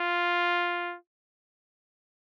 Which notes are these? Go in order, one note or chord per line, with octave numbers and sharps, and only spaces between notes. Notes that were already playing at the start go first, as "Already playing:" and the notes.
Already playing: F4